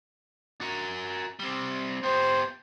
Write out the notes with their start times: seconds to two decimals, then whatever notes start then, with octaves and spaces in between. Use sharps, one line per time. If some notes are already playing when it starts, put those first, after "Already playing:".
0.61 F#4 A#4
1.39 G3 C4
2.03 B3 G4 C5